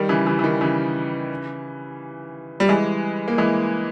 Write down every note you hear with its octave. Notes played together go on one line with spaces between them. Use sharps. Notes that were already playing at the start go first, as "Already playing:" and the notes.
Already playing: D#3 G3
C#3 E3
C#3 E3
E3
D#3
C#3 E3
G3
E3 G#3
A#3
E3 G#3